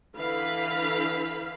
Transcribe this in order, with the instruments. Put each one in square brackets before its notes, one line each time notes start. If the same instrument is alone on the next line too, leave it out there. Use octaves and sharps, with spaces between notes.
[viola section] D3 E3 B4 F5 B5